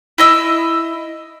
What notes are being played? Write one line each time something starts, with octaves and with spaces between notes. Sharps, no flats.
E4 D#5 E6